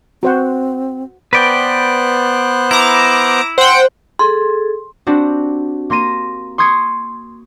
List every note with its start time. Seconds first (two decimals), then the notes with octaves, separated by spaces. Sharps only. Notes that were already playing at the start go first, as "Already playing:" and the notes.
0.23 C4 F#4 C5 F#5
1.33 B3 B4 C5 D5 G5 F#6
2.71 E4 A#5 D6
3.58 C5 F#5 G5
4.19 G#4 A4 C6
5.07 C4 D4 F#4 G4
5.90 A#3 C6 A#6 D#7 E7
6.58 C6 C#6 D#6 G#6 C7 C#7